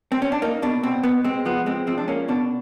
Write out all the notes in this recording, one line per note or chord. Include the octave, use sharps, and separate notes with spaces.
C4
C#4
D4
A#3 D#4
B2 D4
B2 C4
B2 B3
G#3 C4
F3 B3
G#3 C4
F3 C4
D4
A#3 C#4
B2 D4